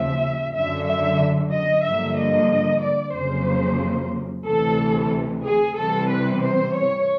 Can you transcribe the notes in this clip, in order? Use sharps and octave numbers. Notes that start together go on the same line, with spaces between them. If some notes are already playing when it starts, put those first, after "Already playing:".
Already playing: D#2 C#3 F3 E5
F#2 D3 F#3 E5
E5
D#5
G2 D3 F3 A#3 E5
D#5
D5
F2 C#3 F#3 A#3 C5
D2 C3 E3 A4
G#4
C3 E3 G3 C4 A4
B4
C5
C#5